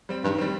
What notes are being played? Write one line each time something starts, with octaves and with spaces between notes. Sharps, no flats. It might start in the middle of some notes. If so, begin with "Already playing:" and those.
G3 C4
G2 D#3
G3 C4